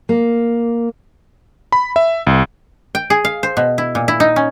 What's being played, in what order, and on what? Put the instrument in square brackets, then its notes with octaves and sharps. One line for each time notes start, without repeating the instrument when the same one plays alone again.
[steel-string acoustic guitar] A#3
[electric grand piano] B5
E5
C2
[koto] G5
G#4
F5
C5
B2
E4
A#2
E4
D#4
C#4